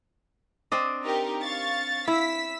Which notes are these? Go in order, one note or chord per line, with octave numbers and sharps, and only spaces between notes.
C4 D4 D#5
D#4 G4 A#4
F5 C#6 A6
E4 E6 B6